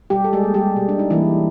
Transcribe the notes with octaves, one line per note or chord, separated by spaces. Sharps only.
B2 G3 G4
A4
G#3 G#4
G3 A#3
G3 G4
B2
D4
D#4
E3 G3 A#3 E4